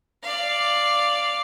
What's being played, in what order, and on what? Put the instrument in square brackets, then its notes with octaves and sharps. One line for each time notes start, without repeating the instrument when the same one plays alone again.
[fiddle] D5 F5